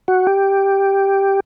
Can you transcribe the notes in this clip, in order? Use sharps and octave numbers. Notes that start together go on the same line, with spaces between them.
F#4
G4